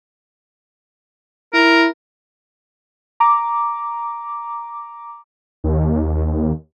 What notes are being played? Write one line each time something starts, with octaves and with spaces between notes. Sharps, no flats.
E4 A#4
A#5 D6
D#2